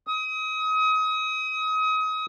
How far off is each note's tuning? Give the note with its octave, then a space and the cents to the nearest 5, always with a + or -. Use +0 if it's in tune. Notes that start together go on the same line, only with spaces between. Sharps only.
D#6 +30